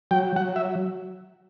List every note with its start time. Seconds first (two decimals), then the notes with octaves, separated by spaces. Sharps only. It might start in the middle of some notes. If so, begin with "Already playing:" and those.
0.11 F#3 G5
0.36 F#3 F#5
0.56 E5